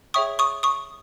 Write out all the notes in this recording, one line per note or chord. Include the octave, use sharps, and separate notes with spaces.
G#4 C#5 E5 G5 C#6 D#6
C#6 D#6
C#6 D#6